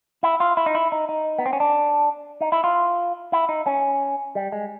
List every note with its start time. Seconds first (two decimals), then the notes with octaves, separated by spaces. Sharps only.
0.23 E4
0.40 F4
0.57 E4
0.66 D#4
0.75 E4
0.92 D#4
1.09 D#4
1.39 B3
1.46 C4
1.53 C#4
1.60 D4
2.41 D#4
2.52 E4
2.64 F4
3.32 E4
3.49 D#4
3.66 C#4
4.35 G3
4.52 G#3